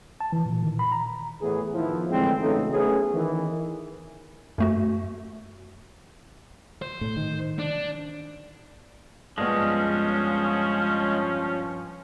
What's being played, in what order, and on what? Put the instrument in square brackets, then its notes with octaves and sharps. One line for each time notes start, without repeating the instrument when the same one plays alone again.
[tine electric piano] A5
E3
A#2
D#3
B5
A#5
[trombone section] A2 E3 B3 G#4
D#3 F3 B3 E4
A2 D3 E3 G#3 C4
C#3 E3 F#3 A3 D#4 A4
A3 B3 C#4 E4 G#4
D#3 E3
[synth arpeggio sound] F#2 A3 F#4
[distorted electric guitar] C5
[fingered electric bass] A2
D#3
[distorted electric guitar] D4
[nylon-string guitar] G2 B3 [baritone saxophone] F3 [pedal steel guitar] G#3 [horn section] C#4